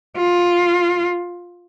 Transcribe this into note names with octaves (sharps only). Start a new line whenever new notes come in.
F4